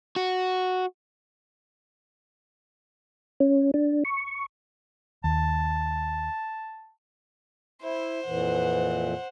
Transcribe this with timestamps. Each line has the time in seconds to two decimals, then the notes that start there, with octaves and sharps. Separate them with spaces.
0.16 F#4
3.40 C#4
3.74 D4
4.05 C#6
5.24 D#2 A5
7.83 E4 C5
8.27 F2 A#2 E3 B4 F#5